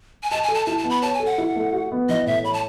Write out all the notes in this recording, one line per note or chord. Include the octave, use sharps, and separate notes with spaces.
G#5
D#5 A5
G#5
A4
A5
E4 A5
A5
B3
B5
C#5 A5
G#5
A4
F#5
E4
A3
F#4
B3
E3 D#5
A2 E5
C#5 B5
A5